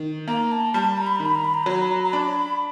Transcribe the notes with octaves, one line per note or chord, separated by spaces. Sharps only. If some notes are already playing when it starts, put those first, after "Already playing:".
Already playing: D#3
A#3 A#5
A5
G3 A5
A#5
B5
D#3 A#5
B5
A#5
B5
A#5
F#3 B5
A#5
B5
A#5
A#5
D4 B5